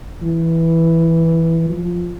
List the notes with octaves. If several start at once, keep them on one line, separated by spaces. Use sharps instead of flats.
E3
F3